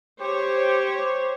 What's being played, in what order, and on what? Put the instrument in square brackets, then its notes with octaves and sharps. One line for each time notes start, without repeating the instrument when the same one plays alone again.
[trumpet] G4 [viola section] C5 C#5